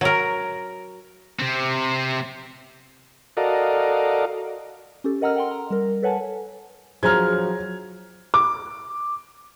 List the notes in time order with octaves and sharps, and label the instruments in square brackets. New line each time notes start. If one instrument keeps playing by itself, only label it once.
[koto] F#3 A#4
[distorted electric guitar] C3 C4
[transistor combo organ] F#4 A4 A#4 D5 D#5 F5
[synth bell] C#4 G4 A4
A#4 D#5 F#5 A#5 E6 F6
F#5 G5 C6
A#5
G3 A#4
A4 B4 C#5 F#5 G#5 A5
[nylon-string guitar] F3 D4 C5 [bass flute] F#3 [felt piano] G#4 A#5 [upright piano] F6 G#6
[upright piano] D6